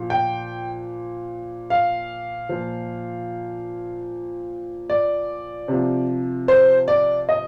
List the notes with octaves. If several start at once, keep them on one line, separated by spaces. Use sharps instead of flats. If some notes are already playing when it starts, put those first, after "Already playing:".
Already playing: A#2 F3
G5
F5
A#2 F3
D5
C3 F3
C5
D5
D#5